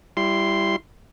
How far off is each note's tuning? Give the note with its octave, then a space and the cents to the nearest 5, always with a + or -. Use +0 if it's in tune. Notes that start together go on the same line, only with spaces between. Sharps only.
G3 +0 E4 +20 C6 +0